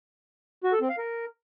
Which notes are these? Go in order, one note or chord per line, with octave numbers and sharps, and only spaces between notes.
F#4
A4
C4
F5
A#4